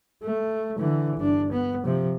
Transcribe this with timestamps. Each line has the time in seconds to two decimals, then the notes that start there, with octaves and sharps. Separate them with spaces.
0.23 A3
0.78 D3 E3
1.17 G1 D4
1.52 B3
1.84 C3 F3